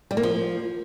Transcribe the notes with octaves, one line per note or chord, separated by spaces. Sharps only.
G3
A#3
F3